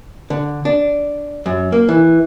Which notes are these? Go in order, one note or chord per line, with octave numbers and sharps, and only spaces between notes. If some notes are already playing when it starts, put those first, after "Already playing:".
D3
D4
F#2
A#3
E3